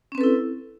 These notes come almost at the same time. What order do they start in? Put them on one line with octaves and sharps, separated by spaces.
C#4 C4 B4 A4 E4